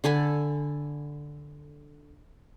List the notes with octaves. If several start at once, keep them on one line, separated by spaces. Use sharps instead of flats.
D3 A4 G#5 B5